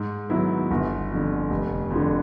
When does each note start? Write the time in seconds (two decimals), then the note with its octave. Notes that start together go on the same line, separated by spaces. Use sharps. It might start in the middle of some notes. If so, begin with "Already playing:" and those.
Already playing: G#2
0.30 D#3 F#3 B3 E4
0.71 G1
1.11 F2 D3
1.50 F1
1.90 F2
1.96 D3